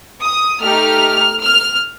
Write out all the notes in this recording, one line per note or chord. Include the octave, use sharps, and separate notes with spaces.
D#6
A3 D#4 G4 F6
F6